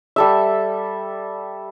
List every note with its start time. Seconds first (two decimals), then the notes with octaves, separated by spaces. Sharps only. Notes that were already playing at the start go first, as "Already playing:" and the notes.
0.16 G3 A4 E5